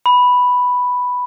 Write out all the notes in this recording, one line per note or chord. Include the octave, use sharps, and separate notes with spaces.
B5